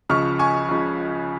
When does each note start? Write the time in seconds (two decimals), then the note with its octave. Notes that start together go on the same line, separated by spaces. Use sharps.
0.09 C#2 C#3 F3 C#6 F6
0.39 G#5 C#6
0.69 C#2 C#3 F3